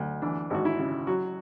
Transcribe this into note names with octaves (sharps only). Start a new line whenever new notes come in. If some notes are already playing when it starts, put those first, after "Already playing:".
Already playing: D2 F#3
E3 D4
G#1 F#4
E4
C#3
F#3 F#4